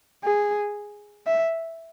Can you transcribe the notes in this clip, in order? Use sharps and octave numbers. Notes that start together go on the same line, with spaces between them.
G#4
E5